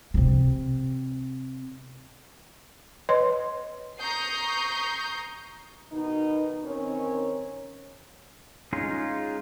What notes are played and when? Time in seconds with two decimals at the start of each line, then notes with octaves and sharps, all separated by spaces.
0.14 C3 C4
3.09 B4 C#5 D#5 C6
4.00 A#5 C#6 D#6 G6 C7
5.92 B2 D#3 D#4
6.64 D#3 C4 C#4 A#4 C#5
8.73 G#3 C#4 D#4 F4 G#4